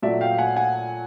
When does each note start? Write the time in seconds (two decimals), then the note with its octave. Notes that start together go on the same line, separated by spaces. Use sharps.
0.02 A#2 F#3 A3 D5 E5
0.21 F5 G5
0.38 F#5 G#5
0.56 F#5 G#5